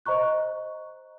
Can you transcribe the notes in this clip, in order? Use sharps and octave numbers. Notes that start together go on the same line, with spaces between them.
C5 D#5 A#5 C#6 F#6